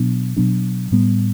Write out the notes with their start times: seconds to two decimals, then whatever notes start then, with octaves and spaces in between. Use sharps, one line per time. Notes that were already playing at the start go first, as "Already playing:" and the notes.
Already playing: B2 F#3 B3 D4
0.37 B2 F#3 B3 D4
0.92 A2 G3 B3